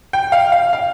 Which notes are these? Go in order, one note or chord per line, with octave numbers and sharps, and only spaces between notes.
G5
F5
F5
F5